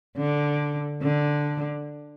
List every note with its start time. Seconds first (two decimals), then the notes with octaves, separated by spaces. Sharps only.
0.17 D3
1.02 D3